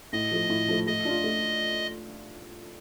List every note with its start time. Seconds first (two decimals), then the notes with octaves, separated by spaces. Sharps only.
0.12 A2 D#5
0.31 F3 A3
0.50 A2
0.68 F3 A3
0.86 A3 D#5
1.05 D4 F4
1.24 A3